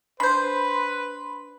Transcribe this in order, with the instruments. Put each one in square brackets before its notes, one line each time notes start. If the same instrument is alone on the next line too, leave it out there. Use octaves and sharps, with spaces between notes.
[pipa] D4 C5 [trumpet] B4 [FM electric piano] B5 C6